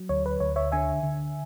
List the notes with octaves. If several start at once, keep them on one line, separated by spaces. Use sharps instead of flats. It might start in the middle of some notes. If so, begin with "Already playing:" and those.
Already playing: F#3
D2 C#5
B4
D2 C#5
C#5 E5
D3 E5 G#5
D3